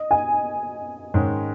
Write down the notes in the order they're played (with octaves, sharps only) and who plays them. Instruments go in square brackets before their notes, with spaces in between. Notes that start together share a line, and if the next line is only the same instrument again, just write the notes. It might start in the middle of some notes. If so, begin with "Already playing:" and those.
Already playing: [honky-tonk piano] D#5
G#5
[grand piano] G#2 D#3 G#3 C#4